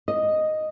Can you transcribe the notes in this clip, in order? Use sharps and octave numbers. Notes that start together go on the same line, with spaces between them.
D#5